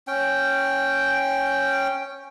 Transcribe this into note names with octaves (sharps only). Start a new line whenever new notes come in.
C#4 G5